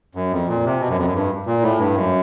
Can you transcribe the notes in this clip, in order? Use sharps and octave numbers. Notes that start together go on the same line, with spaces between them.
F#2
F2
A#2
C3
B2
F#2
F2
F#2
G2
A#2
A2
G2
F#2